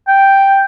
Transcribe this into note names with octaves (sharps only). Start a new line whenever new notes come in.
G5